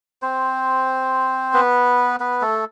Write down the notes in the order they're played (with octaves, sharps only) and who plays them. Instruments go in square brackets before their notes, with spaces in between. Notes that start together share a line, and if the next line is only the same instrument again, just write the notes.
[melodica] C4 C5
B3 B4
B3 B4
A3 A4